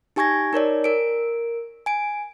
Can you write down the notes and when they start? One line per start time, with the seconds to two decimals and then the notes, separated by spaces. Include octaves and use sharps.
0.16 D#4 G4 G#5 C#6 G#6 A#6
0.53 D#4 A#4 C#5 D5
0.84 A#4 D7
1.86 G#5 D7